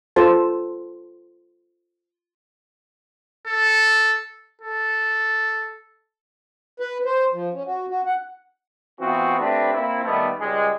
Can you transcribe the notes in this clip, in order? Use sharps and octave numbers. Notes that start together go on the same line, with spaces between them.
F4 A4 C5 A5
A4
A4
B4
C5
F3
C#4
F#4
F#4
F#5
E3 B3 C4 F4 F#4
A3 C4 D4 G4 B4
A#3 C4 E4
D#3 G3 A3 B3
C#2 G3 G#3